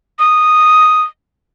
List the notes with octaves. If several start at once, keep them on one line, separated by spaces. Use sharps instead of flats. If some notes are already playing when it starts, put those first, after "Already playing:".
D#6